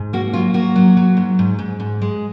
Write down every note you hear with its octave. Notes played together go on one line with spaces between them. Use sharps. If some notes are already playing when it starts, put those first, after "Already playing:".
Already playing: G#2
A#3 F#4
F#3 F4
A#3 F#4
F#3
F#3
G#2
G#2
G#2
G#2
G#3